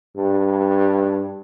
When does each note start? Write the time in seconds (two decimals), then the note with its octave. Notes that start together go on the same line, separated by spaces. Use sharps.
0.17 G2